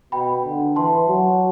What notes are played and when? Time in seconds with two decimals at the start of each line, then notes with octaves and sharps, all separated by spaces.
0.12 B2 G5 B5
0.44 D3
0.76 E3 A5 C6
1.08 F#3